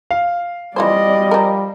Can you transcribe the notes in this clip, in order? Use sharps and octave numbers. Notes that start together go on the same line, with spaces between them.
F5
E3 G3 F4 C5 D5 D#5
F3 A#4